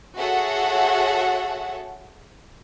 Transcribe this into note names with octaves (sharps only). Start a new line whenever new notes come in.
F#4 G#4 A4 C#5 E5 F#5